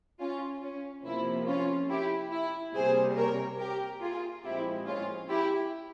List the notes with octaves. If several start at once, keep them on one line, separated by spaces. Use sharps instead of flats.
C#4 F4
C#4
C3 F3 A#3 E4
C#4 F4
E4 G4
E4
C3 G3 A#3 G#4 C5
A#4 C#5
G4 A#4
F4 G#4
A#2 F3 G#3 C4 E4 G4
C#4 F4
E4 G4